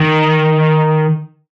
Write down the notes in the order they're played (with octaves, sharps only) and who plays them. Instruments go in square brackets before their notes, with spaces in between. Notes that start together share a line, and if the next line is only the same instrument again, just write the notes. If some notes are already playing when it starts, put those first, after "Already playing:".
Already playing: [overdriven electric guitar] D#3